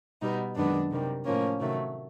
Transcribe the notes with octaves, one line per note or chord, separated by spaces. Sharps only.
B2 G3 B3 D#4
F#2 D#3 G#3 B3 D4
C3 D#3 G3
A2 F3 A#3 C#4
C3 D#3 F#3 A3